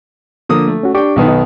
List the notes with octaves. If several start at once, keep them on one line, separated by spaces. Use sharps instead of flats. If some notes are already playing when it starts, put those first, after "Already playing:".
D3 F3 A#3 D#6
A3
C#4 F#4
D4 G4 G5 C#6 D6
B1 D#3 B3
D#4